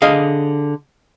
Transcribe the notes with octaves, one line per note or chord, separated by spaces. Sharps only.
D3 G#4 D#5 F5